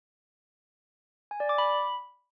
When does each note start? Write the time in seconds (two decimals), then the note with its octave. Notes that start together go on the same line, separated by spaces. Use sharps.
1.31 G#5
1.40 D5
1.49 D6
1.58 B5